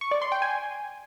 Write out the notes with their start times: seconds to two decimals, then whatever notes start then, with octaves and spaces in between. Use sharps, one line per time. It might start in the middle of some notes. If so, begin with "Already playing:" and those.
0.01 C#6
0.11 D5
0.22 C6
0.32 G5
0.42 G#5